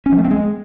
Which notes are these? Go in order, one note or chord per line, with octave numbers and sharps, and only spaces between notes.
C#4
F3
A3
C4
G#3